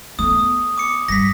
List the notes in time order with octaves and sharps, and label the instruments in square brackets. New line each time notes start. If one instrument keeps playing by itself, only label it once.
[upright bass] A3 B3 [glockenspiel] D#6
[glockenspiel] D6 C#7
[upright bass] G2 G3 [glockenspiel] A#6 B6